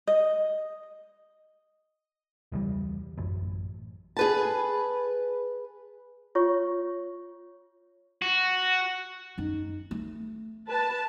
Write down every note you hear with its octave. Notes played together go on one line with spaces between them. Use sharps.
D#5
E1 C#2 E3 G3
A1 F#2
G#4 B4 A5
F4 C#5 C#6
F#4
F#2 D#4
A3
B4 A5